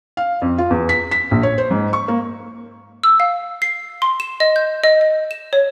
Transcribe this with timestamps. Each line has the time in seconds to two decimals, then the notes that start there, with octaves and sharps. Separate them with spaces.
0.17 F5
0.42 F2
0.58 F4
0.70 E2
0.89 B6
1.11 B6
1.31 A#1
1.43 C#5
1.58 C5
1.71 G#2
1.93 C#6
2.08 A#3
3.04 E6
3.20 F5
3.62 C7
4.02 C6
4.20 E7
4.40 D#5
4.56 G6
4.84 D#5
5.01 D#5
5.31 E7
5.53 C#5